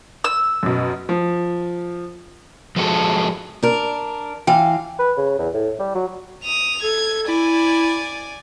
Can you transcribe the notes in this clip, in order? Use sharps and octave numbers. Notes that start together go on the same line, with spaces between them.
E6
F#2 B2
F3
F3 G#3 F#4 A4
D4 A#4
E3 F5 G5
B4
C#3
E2
A2
G3
F#3
D#6 F7
A4 G#6
E4 D5 G#5